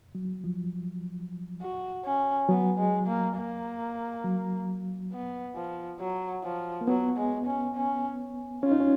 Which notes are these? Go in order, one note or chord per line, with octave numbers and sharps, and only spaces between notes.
F#3
F3
F#4
C#4
F#3 B3
G#3
A#3
A#3
F#3
B3
F3
F#3
F3
A#3
F#3 B3
G#3
C#4
C#4
C#4 F4
D#4
C#4